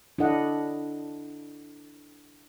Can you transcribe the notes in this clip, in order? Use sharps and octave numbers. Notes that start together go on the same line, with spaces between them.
D4 E4 A4 D#5 F#5